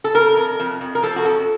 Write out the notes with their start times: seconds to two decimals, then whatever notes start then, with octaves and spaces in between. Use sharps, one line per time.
0.04 A4
0.15 F2 A#4
0.37 F2
0.60 F2
0.81 F2
0.95 A#4
1.03 F3 A4
1.16 F#4
1.25 F2 A4